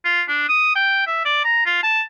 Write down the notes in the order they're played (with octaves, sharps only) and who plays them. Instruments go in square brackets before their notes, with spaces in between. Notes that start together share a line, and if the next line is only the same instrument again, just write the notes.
[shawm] F4
D4
D#6
G5
E5
D5
A#5
F4
A5